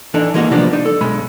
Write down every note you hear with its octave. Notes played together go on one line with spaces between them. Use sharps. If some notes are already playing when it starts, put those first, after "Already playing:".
E3 D4 D#4 A4
E3 G#3 A#3 D#4 F4 F#4
C3 F3 G3 A#3 B3 D4
D4 D#4
A4
B1 G#3 B5